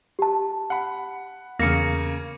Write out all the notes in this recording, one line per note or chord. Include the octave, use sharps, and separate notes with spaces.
G4 A5
F#5 B5
E2 C#3 A#3 A#6 C#7